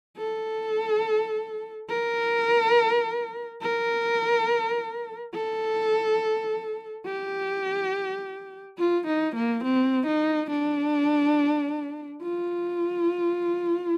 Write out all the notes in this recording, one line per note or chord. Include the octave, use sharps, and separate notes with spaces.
A4
A#4
A#4
A4
G4
F4
D#4
A#3
C4
D#4
D4
F4